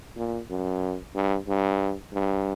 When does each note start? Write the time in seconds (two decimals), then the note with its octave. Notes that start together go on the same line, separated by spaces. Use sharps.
0.16 A#2
0.50 F#2
1.15 G2
1.47 G2
2.13 G2